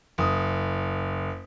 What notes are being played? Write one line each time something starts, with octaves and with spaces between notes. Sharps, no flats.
F#1 D#6